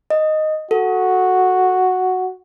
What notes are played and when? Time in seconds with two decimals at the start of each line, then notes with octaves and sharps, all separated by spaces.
0.10 D#5
0.71 F#4 A4